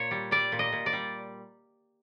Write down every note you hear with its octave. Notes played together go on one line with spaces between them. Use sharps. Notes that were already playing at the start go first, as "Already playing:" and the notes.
Already playing: A#2 C#5
G3
G3 D5
A#2
D#5
A#2
D5
G3